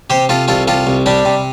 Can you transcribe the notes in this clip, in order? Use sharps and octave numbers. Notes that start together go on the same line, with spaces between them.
C3 G4 C5
C3 F4 A4
C2 F4 A4
C3 F4 A4
C2
G3 D4 G4
C3